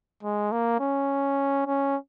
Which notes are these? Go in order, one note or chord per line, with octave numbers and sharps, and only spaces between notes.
G#3
A#3
C#4
C#4